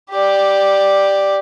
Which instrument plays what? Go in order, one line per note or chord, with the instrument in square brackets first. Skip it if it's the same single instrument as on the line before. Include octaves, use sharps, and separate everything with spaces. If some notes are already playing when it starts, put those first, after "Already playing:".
[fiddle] G4 D5